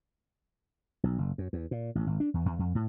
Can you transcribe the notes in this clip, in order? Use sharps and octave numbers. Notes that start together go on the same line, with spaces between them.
B1
F#1
F#2
E2
A#2
A1
G#1
D4
E2
E2
F2
A2